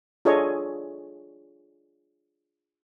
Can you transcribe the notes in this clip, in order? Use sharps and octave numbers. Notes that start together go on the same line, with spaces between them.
D4 F4 G#4 A4 C#5 D#5